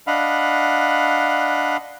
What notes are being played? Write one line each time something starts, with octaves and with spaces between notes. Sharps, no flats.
D4 D#5 F5 F#5 B5